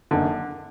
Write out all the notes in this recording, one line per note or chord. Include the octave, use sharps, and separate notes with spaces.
F#1 F#2 D3 D#3 A#3